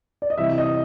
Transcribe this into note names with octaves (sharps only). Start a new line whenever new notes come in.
D5
D#5
C3 E3 G3 E5
D#5